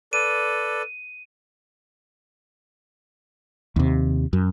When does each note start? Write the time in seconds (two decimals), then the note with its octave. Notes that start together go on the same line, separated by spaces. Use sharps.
0.13 A4 B4 D5 D#7
3.76 D#2 C3
4.33 F#2